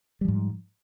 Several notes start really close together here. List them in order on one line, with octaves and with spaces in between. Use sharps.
G3 F3 G#2